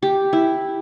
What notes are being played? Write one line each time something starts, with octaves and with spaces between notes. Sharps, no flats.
G4
E4